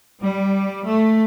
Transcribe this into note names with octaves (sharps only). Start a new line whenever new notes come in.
G3
A3